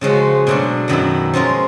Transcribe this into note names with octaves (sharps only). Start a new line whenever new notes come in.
C#3 F3 G#3 C#4 F#4
B2 F#3 A3 D4
F#2 D#3 F#3 B3 E4
F3 G#3 C#4 F4 A#4